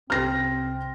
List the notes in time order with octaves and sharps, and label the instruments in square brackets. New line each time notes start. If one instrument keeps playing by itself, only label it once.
[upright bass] C2 [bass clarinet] C4 [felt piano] F6 A#6